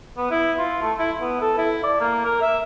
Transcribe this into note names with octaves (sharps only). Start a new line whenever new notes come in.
B3
E4
F4
A3
E4
B3
A4
E4
D5
A#3
A#4
E5